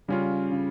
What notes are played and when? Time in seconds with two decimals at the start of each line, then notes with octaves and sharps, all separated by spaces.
0.08 C#3 G3 C#4 F4
0.51 C#3